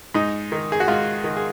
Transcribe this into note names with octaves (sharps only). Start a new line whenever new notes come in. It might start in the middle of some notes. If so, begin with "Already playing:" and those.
G#2 D#4
D#3
G#4
F#4
G#2 F4
D#3
G#4